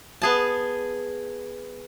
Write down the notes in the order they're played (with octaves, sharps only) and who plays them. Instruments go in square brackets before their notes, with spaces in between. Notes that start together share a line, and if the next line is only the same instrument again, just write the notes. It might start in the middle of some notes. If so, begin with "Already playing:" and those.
[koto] B3 G#4 A5